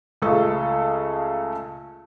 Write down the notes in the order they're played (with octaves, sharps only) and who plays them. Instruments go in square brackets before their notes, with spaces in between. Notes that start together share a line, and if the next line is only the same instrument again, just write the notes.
[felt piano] C#2 C#3 A3 G#4 A4 C#6